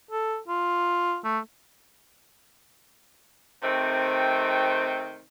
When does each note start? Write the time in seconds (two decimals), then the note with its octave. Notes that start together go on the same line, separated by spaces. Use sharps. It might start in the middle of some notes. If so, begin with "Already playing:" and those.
0.11 A4
0.48 F4
1.25 A3
3.63 C3 D#3 A3 C4